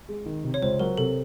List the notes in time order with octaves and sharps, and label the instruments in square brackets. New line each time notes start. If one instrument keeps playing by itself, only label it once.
[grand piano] G#3
D#3
C3
[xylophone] C#5
[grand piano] C#2 [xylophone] C5
[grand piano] F#3 [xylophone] A#4
[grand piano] C3 [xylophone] A4